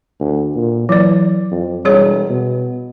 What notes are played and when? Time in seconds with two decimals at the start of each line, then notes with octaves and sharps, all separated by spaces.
0.20 D2
0.56 A#2
0.89 E3 F#3 D5
1.51 F2
1.85 E1 G3 G#4 C#5
2.29 B2